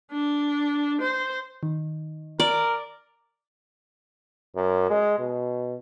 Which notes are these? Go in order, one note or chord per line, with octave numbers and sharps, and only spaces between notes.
D4
C5
D#3
A#4 D5
F#2
G#3
B2